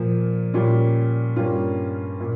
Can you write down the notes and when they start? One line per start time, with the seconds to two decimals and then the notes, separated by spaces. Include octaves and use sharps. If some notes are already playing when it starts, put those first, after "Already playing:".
Already playing: A#2 F3 A#3
0.54 A#2 G3 C#4 F4
1.36 G2 G3 A#3 C#4 F4
2.20 A#2